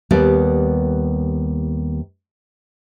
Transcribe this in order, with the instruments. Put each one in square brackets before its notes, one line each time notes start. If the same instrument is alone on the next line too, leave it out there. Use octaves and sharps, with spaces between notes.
[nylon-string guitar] D#2 G3 B3 D5